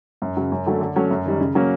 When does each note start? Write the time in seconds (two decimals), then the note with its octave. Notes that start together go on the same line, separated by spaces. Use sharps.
0.22 F#2
0.37 C#3 F#3
0.52 F#2
0.66 D3 F#3 A3
0.81 D3
0.96 F#3 A3 C#4
1.11 F#2
1.26 D#3 G3
1.41 C#3
1.55 F#3 A#3 C#4